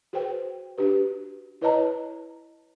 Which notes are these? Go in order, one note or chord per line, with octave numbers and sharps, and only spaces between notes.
F#4 G#4 B4 C5 G5
D4 F#4 G4 B4
E4 B4 C#5 D#5 A5 A#5